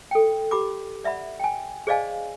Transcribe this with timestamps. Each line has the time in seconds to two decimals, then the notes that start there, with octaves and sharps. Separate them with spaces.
0.11 A4 G5
0.51 G4 B5 D6
1.04 D5 E5 F#5 B5
1.40 G5 G#5
1.87 G#4 C5 D5 D#5 F5 G#5